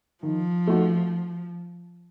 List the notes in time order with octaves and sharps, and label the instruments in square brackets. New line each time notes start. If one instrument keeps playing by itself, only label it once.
[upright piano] D#3 [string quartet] F3
[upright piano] A3 D#4 F#4